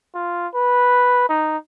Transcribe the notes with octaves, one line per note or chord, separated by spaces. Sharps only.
F4
B4
D#4